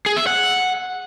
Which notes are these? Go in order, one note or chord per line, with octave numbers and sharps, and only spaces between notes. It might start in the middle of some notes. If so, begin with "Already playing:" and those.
G#4
E5
F#5